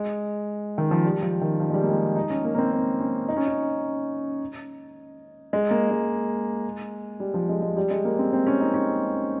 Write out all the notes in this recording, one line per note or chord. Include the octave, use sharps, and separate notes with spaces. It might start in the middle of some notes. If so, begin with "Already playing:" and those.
Already playing: G#3
D#3
F3
G3
F3
D#3
F3
G#3
G3
A#3
G#3
D#4
C#4
A#3
A#3
C4
C4
C#4
D#4
C#4
D#4
G#3
A#3
G#3
G3
F3
G#3
G#3
G3
G#3
A#3
C4
C4
C#4
D#4
C#4